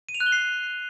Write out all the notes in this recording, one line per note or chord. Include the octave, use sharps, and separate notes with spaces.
D#7
F7
F#6
G7
C7